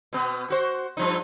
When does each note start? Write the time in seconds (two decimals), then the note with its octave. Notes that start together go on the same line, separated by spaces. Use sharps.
0.13 B2 B3
0.50 F#4 C5
0.97 G2 F3 D#4